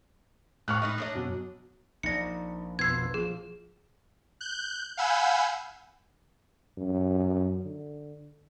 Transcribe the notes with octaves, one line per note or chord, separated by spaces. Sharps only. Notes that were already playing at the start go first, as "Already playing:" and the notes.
A2 C#6 F6 F#6
D#4 B4 D#5
D4 C#5 D#5
F#2 B2
A#1 D#4 D5 A#6 C#7
F2 B2 B3 C6 E6 G#6 C7
F3 G#4
F#6 G6
F5 F#5 G#5 B5 E6 G6
F#2
D3